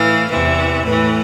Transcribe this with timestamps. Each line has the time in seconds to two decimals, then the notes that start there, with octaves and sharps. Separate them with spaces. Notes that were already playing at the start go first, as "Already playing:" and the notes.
Already playing: A2 E3 F5
0.30 E2 C3 E3 E5
0.85 A2 E3 B4